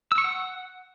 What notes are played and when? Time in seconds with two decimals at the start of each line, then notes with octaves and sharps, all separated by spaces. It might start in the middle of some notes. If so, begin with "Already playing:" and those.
0.12 E6
0.18 C#6
0.24 F#5